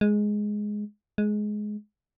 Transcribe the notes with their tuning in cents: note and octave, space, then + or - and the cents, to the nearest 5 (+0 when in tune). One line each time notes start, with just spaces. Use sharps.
G#3 +5
G#3 +15